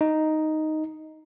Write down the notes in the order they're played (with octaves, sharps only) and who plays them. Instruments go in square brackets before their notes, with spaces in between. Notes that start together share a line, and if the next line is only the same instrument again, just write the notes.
[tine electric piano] D#4